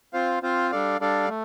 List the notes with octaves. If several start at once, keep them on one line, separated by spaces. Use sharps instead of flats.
C4 F4 C5 F5
C4 F4 C5 F5
G3 D4 A4 D5 F5
G3 D4 A4 D5 F5
A3